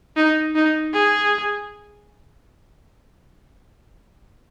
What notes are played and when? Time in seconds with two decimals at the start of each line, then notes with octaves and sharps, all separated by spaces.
0.17 D#4
0.56 D#4
0.93 G#4